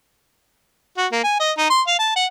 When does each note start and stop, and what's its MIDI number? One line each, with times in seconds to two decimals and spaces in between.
0.98 1.07 66
1.12 1.19 58
1.24 1.36 80
1.40 1.51 75
1.58 1.66 63
1.70 1.82 84
1.87 1.96 77
1.99 2.13 81
2.16 2.26 78